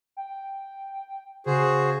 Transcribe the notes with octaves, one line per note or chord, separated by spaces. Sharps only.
G5
C#3 F#4 G#4 C5